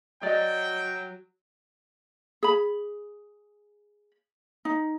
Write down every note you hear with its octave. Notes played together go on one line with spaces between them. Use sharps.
F#3 D5 D#5 G5
G#4 B5
D#4